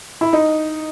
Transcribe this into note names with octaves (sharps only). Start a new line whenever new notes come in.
E4
D#4